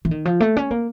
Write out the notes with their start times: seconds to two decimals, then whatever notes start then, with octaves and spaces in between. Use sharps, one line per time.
0.05 E3
0.11 D#3
0.25 F3
0.40 A3
0.57 C#4
0.71 A#3